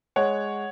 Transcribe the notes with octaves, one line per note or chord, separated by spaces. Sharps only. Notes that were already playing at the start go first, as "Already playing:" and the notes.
G#3 C#5 F#5